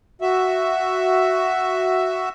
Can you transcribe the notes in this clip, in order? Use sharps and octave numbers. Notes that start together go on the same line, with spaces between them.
F#4 E5